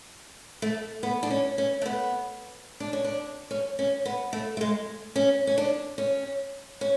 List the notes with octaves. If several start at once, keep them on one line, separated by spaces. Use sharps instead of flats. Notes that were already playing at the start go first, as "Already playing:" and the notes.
A3
B3
D4
C#4
C#4
A3
B3
D4
C#4
D4
C#4
C#4
B3
A3
A3
G#3
C#4
C#4
D4
C#4
C#4